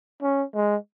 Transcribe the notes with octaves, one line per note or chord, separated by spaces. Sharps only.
C#4
G#3